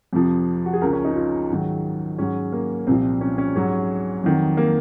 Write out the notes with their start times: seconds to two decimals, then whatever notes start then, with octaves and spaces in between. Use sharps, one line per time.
0.13 F2 C3 F3
0.66 F#4
0.73 G#4
0.81 C#2 C#3 F3 A#4
0.93 C#4
1.05 D#4
1.16 F4
1.50 G#2 D#3 F#3
2.18 G#2 F#3 C#4
2.52 A#3
2.87 C2 A#2 F3 C4
3.21 C#4
3.38 C#4
3.56 G#2 F#3 C#4
4.24 F2 D#3 F#3
4.57 A#3